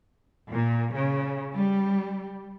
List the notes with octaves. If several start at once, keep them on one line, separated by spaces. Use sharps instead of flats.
A#2
C#3
G3